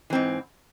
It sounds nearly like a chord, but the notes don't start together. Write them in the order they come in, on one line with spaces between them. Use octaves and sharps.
E3 C4 G#2